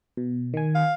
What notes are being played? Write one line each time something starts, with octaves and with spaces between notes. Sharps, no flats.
B2
D#3 G#5
F5